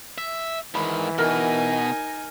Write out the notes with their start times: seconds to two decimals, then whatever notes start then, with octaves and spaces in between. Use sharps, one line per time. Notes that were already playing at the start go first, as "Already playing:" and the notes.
0.18 E5
0.75 G#2 D#3 E3 B5
1.18 B2 D#4 A#4 G#5